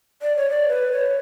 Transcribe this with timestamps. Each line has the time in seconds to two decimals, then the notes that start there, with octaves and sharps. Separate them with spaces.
0.22 D5
0.37 C#5
0.50 D5
0.68 B4
0.92 C#5